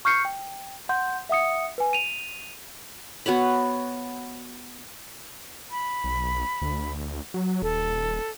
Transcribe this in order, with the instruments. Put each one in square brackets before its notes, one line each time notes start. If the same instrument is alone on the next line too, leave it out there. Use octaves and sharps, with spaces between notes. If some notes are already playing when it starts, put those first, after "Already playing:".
[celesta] C#6 F6 G6 C7 C#7
G5
F#5 C6 G6
E5 F#5 D#6 C#7
B4 G#5
D#7 F7
[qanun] B3 F#4 C#5 B5
[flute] B5
[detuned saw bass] B1
D2
F#3
[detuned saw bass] D#1 [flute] A4